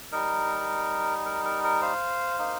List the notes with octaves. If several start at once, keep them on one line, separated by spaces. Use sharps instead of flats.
G3 D#4 A#4
A#4
A#4
A#4
C5 F5
A#3 D#4